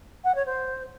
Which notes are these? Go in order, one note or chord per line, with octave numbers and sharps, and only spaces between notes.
F#5
C#5
C5